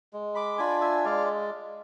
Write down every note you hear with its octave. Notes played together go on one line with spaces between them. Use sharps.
G#3
B5 D6
D4 F4 G#5 B5
E5 G#5
G#3 D5 F5